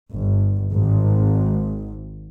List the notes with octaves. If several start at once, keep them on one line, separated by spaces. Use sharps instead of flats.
G1
G#1